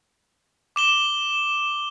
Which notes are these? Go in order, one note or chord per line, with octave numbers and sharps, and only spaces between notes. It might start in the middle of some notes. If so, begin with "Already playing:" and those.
D6 E7 G7